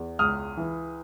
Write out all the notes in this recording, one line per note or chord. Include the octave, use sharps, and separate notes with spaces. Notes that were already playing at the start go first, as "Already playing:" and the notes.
Already playing: E2
C#2 D#6 F6
E3